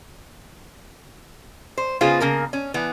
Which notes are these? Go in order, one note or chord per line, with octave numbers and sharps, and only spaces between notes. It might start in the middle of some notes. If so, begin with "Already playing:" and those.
C5
C#3 B3 F4 G#4 C5
C#3 A#3 A#4
C#4
E3 B3